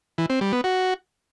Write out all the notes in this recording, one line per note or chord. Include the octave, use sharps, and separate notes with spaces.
E3
C4
G3
B3
F#4